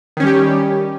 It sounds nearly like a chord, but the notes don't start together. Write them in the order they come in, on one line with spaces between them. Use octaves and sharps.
D#3 C#4 G3 G4